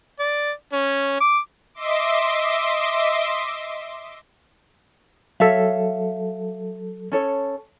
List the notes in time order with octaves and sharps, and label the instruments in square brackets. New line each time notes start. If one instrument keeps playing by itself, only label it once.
[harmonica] D5
C#4
D6
[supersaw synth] D#5 E5 C6 D6
[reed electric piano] F#3 A4 [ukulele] C#5 E5 F5
[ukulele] C#4 A4 C#5